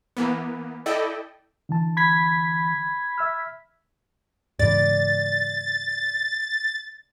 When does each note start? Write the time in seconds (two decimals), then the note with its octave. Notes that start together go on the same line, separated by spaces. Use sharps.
0.17 E3 A#3 B3
0.86 E4 A4 D5 D#5 G5
1.69 D3 E3 A5
1.97 B5 G#6 B6
3.18 E5 E6 F6
4.59 G#2 C#3 E3 D5 A6